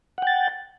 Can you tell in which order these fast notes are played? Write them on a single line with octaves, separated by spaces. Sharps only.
F#5 G5 A6